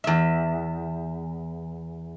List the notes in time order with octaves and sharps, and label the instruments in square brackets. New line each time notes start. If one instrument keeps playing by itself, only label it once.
[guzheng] E2 E5